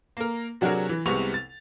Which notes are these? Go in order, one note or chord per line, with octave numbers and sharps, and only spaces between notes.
A#3 A#4
C3 F#3 D4 F#4 G#4 A#4
E3
C2 C3 G#3 B3 C#6 F7
A6